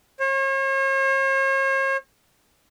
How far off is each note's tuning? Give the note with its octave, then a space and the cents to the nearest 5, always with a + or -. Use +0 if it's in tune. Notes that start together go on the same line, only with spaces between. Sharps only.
C#5 -45